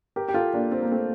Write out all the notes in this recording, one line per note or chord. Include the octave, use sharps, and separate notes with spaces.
G4 A#4
G4
F4 A4
A#3 D4
C4
A#3
A3 C4